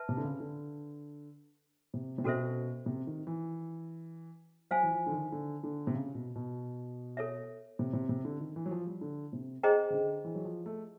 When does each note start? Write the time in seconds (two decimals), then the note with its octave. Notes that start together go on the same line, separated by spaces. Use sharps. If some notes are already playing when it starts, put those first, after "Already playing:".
Already playing: B4 E5 A5
0.09 C3
0.17 D3
0.25 C#3
0.40 D3
1.94 C3
2.18 C3
2.24 B2 C#4 F#4 A4 C5 E5
2.86 C3
3.07 D#3
3.27 E3
4.70 F#3 C5 F5 G#5
4.83 E3
4.92 F3
5.07 D3
5.12 D#3
5.32 D3
5.64 D3
5.87 C3
5.94 C#3
6.15 B2
6.35 B2
7.17 A4 C#5 E5
7.79 C3
7.93 C3
8.09 C3
8.25 D3
8.40 D#3
8.56 E3
8.66 F#3
8.71 F3
8.87 G3
9.01 D3
9.33 C3
9.63 G#4 C5 D#5 G5 A#5
9.90 C#3
9.94 D3
10.24 E3
10.35 F#3
10.45 F3
10.66 A3